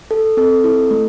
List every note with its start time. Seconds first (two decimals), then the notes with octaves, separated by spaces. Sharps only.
0.11 A4
0.37 C4 A4
0.64 E4 A4
0.91 A3